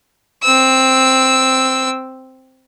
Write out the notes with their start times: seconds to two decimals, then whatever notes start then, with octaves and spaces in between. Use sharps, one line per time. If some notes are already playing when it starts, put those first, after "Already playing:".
0.43 C4 E6